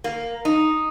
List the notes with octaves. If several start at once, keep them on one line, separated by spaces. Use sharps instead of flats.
A#3
D#4